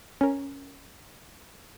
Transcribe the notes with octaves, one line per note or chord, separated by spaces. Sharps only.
C#4 A#4